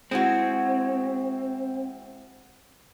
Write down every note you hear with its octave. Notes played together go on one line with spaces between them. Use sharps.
G#3 C4 E4 F#4